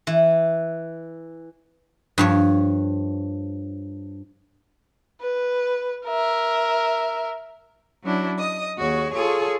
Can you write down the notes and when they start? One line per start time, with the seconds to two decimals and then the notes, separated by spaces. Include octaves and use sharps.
0.07 E3
2.18 G2 F3 C#5
5.21 B4
6.06 A#4 E5
8.04 F#3 C#4 D4 E4 F#4
8.38 D#5 D#6
8.77 D#2 F#4 G#4 C#5
9.11 F4 G#4 A4 C#5 C#6